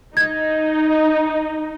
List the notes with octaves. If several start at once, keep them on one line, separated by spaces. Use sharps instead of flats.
D#4 G#6